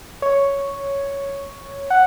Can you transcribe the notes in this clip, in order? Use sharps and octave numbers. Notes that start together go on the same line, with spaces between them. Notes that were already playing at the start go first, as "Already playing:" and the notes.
C#5
F#5